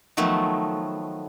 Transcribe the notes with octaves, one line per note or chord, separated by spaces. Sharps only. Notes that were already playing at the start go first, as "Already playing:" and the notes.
D#3 F3 F#3 A3 B3